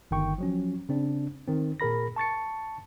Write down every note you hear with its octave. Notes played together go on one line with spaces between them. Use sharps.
G1 D#3 G5 C#6
F3 F#3 C#4
C#3 C4 D4
D#3 C4
A#2 G#4 A#4 B5 A#6
A5 C#6 A6 C#7